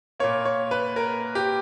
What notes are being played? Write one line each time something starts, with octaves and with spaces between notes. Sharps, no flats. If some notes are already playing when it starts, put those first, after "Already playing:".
A#2 A#3 C#5
C#5
B4
A#4
G4